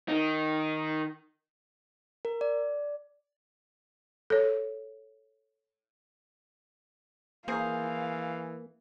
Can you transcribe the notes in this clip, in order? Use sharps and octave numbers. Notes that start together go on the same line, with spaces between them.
D#3 D#4
A#4
D5
A4 C#5
E3 A#3 G#4 C5 F5